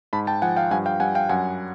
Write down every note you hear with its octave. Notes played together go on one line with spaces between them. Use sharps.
G#2 A5 B5
G5 A5
F3 F#5 G#5
F5 G5
G2 F#5 G#5
F5 G5
G2 F#5 G#5
F5 G5
F#2 F#5 G#5